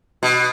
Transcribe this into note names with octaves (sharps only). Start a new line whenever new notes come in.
B2